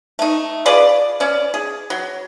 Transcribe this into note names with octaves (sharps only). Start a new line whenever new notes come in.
A3 D#4
F4 G#4 B4 D5
C#4 D5
G#4
F#3